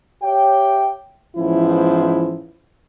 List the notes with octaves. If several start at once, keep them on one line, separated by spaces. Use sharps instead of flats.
G4 C#5 E5 G5
G#2 E3 F3 B3 C#4 E4